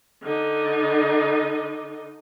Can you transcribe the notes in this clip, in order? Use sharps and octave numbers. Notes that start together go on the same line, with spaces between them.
D3 D#4